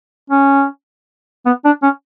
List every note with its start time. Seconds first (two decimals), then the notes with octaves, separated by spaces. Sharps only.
0.30 C#4
1.46 B3
1.65 D4
1.83 C#4